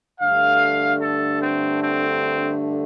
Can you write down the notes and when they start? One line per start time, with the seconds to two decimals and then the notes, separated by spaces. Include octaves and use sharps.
0.20 G2 D3 A3 F5
1.00 A4
1.41 C4
1.81 C4